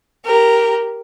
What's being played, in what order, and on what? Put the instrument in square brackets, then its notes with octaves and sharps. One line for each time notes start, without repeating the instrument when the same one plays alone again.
[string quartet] G4 A#4